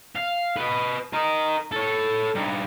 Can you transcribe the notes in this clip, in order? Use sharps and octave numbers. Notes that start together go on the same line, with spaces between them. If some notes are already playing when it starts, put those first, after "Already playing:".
F5
B4 D#5
A#4 D#5
A4 C#5
G2 D#4